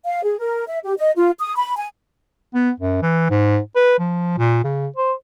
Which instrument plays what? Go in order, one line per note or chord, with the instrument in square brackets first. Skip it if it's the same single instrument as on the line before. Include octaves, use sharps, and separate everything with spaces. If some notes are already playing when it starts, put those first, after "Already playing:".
[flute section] F5
G#4
A#4
E5
G4
D#5
F4
D#6
B5
G#5
[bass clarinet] B3
F#2
E3
G#2
B4
F3
A#2
C#3
C5